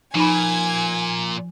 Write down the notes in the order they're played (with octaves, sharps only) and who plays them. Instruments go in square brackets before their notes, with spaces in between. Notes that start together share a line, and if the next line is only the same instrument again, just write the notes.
[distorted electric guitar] A#2 [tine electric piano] F3 [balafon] D#4 B5 [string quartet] G#5 G#6